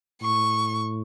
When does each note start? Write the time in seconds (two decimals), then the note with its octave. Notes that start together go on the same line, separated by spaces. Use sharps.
0.22 A2 C#6